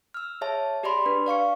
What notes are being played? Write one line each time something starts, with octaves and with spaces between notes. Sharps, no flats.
E6 F6
G#4 C#5 E5 A5
G4 G#4 D5 B5 C6
D4 B4
D5 F5 C#6 C#7